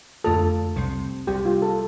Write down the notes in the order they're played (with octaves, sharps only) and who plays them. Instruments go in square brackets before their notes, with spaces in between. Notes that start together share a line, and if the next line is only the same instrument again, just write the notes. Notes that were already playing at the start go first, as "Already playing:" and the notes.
[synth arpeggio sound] F2 D3 A3 D4 F4 [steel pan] A4
[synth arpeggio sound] C2 C3 G3 C4
[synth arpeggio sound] C2 C3 G3 [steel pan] G4
[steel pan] F4
A4